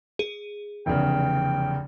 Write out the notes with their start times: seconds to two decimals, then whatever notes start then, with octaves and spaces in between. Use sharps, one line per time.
0.19 G#4
0.86 F1 E2 C#3 G5